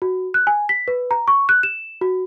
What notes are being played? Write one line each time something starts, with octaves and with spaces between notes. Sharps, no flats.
F#4
F#6
G#5
B6
B4
A#5
C#6
F#6
E7
F#4